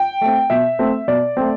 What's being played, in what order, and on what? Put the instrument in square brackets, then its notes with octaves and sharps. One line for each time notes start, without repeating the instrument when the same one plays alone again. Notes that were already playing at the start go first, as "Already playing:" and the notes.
Already playing: [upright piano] G5
A3 C4
B2 E5
A3 C4
B2 D5
A3 C4